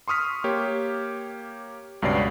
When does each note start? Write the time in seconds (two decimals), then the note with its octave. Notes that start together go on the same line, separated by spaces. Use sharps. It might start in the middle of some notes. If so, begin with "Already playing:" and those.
0.08 C6 C#6 D#6 F6 B6
0.44 A#3 G4 C#5
2.02 C#2 G2 B2 C#4 D5 C7